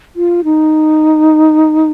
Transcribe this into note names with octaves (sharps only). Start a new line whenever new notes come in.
F4
D#4